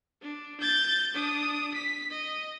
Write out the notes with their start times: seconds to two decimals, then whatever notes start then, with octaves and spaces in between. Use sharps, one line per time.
0.22 D4
0.61 G6 A6
1.15 D4 D#6
1.74 B6
2.11 D#5